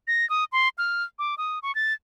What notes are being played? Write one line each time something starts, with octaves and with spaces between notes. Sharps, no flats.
A#6
D#6
C6
F6
D6
D#6
C#6
A6